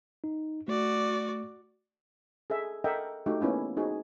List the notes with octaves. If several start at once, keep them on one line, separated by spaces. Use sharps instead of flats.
D#4
A3 F#4 D5
G#4 A4 E5
A4 A#4 D#5 E5 F#5 G5
A3 D#4 F#4 G4
A#3 B3 C#4 E4 F4
C4 D#4 F#4 G#4